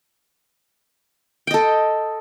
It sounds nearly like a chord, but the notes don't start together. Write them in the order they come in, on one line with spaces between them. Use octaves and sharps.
G5 D#5 A4